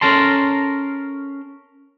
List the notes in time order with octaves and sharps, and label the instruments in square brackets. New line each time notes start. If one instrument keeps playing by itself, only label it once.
[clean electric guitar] C#4 A4 A#4 A5 C6